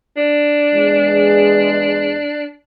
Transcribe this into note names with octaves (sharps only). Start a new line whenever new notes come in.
D4
E2 G#3